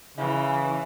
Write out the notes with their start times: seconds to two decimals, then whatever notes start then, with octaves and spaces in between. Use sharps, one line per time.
0.18 C#3 E3